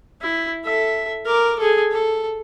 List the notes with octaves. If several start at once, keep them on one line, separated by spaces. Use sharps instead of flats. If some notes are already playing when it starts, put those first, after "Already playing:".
E4
A4 E5
A#4 D6
G#4 A4
A4